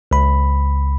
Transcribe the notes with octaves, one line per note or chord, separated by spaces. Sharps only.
C#2 B5